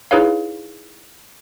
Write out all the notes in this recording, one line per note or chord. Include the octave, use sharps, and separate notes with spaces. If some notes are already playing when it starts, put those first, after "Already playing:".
D#4 E4 G#4 B4 C#5 F5